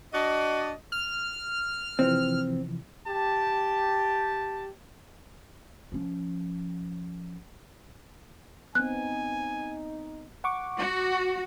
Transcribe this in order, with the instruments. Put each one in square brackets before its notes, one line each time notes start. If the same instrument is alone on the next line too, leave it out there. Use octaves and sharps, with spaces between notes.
[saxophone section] D4 F#4 D5 D#5
[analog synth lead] F6
[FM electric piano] C3 E3 F3 [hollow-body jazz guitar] C4
[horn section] G4 A5
[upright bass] F3 C#4
[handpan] B3 C4 [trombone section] D#4 [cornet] G#5 [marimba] F#6
[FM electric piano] F#5 C#6 D6
[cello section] F#4